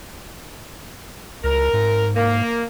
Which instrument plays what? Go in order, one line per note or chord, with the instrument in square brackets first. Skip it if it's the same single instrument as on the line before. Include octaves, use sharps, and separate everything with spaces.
[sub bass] C#2 [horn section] A#4
[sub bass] G#2
[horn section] A#3